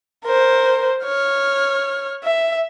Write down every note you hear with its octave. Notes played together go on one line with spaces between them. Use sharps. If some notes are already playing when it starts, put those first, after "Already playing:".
A#4 C5
C#5 F6
E5